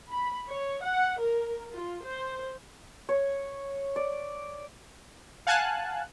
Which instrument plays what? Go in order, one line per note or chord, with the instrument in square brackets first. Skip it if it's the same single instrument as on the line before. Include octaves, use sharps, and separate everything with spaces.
[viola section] B5
C#5
F#5
A#4
F4
C5
[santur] C#5
D5
[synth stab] F5 F#5 G#5 A5 F#6